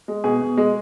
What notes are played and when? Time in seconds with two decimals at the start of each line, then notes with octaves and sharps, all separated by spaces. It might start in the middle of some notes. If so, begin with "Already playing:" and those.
0.08 G#3
0.24 B2 G#4
0.41 B2
0.57 G#3